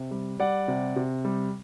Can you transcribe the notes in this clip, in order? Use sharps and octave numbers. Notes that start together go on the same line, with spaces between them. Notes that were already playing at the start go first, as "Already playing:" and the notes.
Already playing: C3
G3
G3 D5 F#5
C3
C3
G3